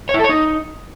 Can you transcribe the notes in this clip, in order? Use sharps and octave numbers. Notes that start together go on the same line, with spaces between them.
C#5
E4
A4
C#5
D#4